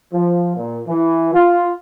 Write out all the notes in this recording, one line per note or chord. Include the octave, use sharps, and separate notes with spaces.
F3
A#2
E3
F4